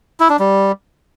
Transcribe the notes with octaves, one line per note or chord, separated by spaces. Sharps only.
E4
D4
G3